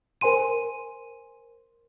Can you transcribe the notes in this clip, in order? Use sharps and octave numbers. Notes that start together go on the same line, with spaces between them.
A#4 C5 G#5 C6 D#7